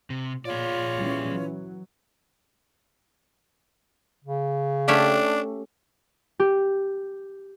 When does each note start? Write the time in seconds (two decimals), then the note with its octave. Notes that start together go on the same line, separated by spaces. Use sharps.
0.10 C3
0.45 A#2 F4 G#4 C#5 D5
0.97 E3 G3 C#4
1.33 F#3
4.24 C#3
4.88 A3 C#4 D4 G4
6.40 G4